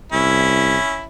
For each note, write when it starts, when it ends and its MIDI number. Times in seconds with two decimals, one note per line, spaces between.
0.12 0.77 36
0.12 1.04 61
0.12 1.04 64